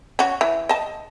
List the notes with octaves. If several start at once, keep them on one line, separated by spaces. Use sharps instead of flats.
C#4 F#4
E3
D#5 A5